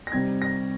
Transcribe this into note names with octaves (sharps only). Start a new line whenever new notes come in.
A#6
C3 G3 C4 D#4 G#6
A#6